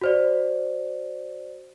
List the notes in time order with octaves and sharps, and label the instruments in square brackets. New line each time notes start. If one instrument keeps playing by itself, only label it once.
[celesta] F#4 C5 D5